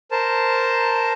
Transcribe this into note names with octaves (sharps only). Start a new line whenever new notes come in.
A#4 C5 A5